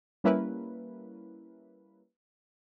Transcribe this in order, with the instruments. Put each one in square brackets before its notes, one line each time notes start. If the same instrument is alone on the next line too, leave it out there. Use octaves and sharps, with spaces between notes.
[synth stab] G3 A#3 C#4 E4 A#4 B4